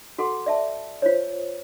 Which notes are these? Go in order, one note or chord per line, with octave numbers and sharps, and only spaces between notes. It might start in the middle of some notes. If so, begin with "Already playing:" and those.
F#4 A4 F#5 C6 D6
D5 E5 A5
F4 C5 C#5